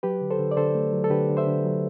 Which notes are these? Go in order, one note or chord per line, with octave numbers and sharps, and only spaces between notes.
F#3 G4 B4
D3
A4 C5
D3
D5
D3 A4 C5
A3
F#3
A4
D3 G4 B4
D3
C5 E5
D3
F#3